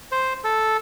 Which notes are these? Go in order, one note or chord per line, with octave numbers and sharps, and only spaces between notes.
C5
A4